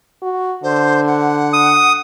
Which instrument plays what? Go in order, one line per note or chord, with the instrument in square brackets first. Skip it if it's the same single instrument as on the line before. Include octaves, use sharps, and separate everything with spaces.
[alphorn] F#4
[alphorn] D3 [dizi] C5
[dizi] F#5
[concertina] D#6